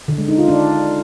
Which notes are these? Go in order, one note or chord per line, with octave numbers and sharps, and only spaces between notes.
D3
G#3
D#4
F4
D4